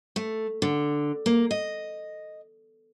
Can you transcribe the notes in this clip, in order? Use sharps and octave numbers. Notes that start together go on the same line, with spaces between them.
A3
D3
A#3
D#5